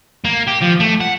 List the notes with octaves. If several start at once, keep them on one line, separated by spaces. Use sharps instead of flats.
A#3
G4
F3
A3
F#5